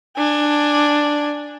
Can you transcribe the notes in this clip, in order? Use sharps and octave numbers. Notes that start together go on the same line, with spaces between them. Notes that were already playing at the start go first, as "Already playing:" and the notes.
D4 G#5